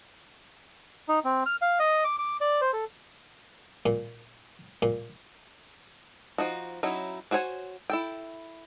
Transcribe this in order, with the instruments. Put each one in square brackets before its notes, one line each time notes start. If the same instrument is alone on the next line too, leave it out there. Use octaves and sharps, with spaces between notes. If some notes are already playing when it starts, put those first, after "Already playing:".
[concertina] D#4
C4
F6
F5
D#5
D6
D6
D5
C5
A4
[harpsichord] A#2
A#2
[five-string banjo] F3 D#4 F#4
F#3 C#4 D#4 E4
D4 F#4 C5 C#5 G#5
E4 A4 G5